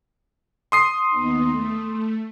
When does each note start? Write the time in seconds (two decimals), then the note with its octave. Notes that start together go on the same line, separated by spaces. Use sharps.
0.72 C6 D#6 C7
1.10 D#2 B3 D#4
1.50 A3
1.85 A3